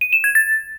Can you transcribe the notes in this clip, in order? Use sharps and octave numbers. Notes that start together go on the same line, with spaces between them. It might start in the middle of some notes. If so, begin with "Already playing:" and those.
D#7
E7
G#6
A6